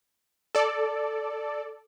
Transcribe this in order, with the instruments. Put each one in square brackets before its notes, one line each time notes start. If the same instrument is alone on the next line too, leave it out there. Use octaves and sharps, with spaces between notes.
[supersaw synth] A4 D5